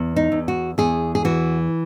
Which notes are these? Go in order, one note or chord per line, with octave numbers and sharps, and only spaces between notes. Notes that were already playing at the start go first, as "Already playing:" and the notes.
Already playing: E2
D#4
E2
F#4
E2 G#4
G#4
E3 F#4